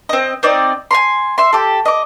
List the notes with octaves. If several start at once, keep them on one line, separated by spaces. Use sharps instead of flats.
C4 D#5
C4 D#4 D5 D#5
G#5 A#5 C6
E5 C6
G4 A4
D#5 D6